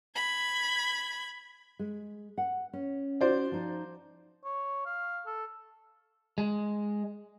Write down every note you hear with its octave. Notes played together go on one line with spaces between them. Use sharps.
B5 G#6
G#3
F#5
C#4
F#4 C5 D5
F3 D#4
C#5
F5
A4
G#3